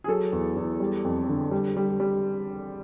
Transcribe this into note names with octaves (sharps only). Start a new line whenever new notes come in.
G#4
F#3 A4
E2
E2
G3
F2
D3
G3
G3
G3